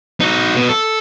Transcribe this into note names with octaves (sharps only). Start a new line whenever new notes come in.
D#4 F#4
B2
A4